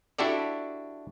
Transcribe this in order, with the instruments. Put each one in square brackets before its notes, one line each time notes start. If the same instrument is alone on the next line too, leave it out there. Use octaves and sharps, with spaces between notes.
[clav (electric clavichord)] D4 E4 F#4 G4 A4 D5